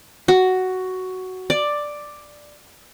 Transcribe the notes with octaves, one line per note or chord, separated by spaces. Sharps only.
F#4
D5